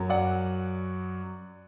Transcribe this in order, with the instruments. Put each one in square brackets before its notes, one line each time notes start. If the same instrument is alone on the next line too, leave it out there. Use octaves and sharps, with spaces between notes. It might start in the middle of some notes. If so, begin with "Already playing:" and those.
Already playing: [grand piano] F#2 F#3
D5 F#5